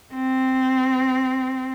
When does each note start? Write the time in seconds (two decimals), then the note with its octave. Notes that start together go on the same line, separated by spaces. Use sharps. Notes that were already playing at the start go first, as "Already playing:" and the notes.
0.14 C4